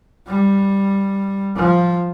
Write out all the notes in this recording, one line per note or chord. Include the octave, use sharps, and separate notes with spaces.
G3
F3